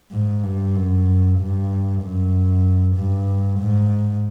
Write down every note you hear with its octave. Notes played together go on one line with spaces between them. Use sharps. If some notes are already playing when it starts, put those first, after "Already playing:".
G#2
G2
F#2
G2
F#2
G2
G#2